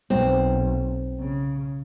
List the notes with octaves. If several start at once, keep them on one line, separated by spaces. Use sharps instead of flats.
B1 C4
C#3